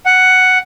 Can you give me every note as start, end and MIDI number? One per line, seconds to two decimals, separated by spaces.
0.06 0.58 78